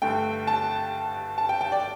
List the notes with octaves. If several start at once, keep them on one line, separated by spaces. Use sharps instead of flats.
G2 D3 A3 G5
A5
A5
G5
G5
D5